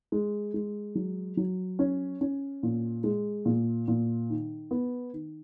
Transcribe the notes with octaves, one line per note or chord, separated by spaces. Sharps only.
G#3
G#3
F#3
F#3
C#4
C#4
A#2
G#3
A#2
A#2
D#3
B3
D#3